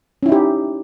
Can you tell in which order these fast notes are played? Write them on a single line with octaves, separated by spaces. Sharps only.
C#4 E4 D#4 G4